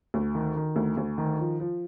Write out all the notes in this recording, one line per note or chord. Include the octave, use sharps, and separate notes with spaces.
D2
D#3
D#3
D2
D2
D#3
F3
F3